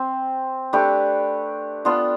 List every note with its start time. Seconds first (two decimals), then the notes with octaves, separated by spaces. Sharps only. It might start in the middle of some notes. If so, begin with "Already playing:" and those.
Already playing: C4
0.73 A3 D4 G4 B4
1.85 B3 D4 F4